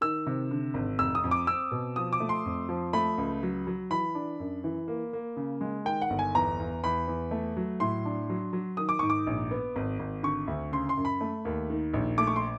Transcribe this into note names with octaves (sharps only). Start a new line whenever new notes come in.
D#3 E6
C3
D3
G#1
F1 E6
D#6
F2
D6
C4 E6
B2
F3 D#6
D6
A3
C6
F2
F3
A3 B5
C#2
F#3
F#3
E3 B5
D4
F#2
E3
A#3
A#3
C#3
G#3
D#3 G5
F#5
G1
G#5
E2 A#5
E2
E2 B5
E2
A3
F#3
A2 C6
D4
F#3
F#3
D#3 D#6
D6
G#2 C#6
D6
A#1
B3
G#1
G#1
D3 C#6
D2
C#3 C6
C6
F#2
B5
A3
D#2
D#3
A#1
A3 D6
C#6
C6